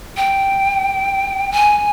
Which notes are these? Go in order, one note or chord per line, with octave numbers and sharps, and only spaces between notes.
G5
G#5